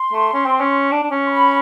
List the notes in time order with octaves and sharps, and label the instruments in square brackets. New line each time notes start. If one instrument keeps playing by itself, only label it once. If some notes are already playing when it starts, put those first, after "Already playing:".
Already playing: [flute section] C6
[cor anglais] A3
C#4
C4
C#4
D4
D4
C#4
[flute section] C6
B5